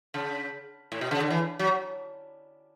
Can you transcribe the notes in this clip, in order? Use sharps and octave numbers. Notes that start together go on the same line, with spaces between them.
C#3
A2
B2
C#3
D3
E3
F#3